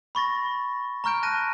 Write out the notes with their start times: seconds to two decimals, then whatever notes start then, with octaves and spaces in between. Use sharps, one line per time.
0.15 B5 C#6 A6 A#6
1.04 A#5 C#6 F6 G6 D7
1.23 A5 F#6 A#6 D#7